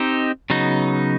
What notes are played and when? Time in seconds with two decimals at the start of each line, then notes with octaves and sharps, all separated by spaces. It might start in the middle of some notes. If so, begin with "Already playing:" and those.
Already playing: C4 D#4 G4 C5
0.50 C#3 F#3 B3 D#4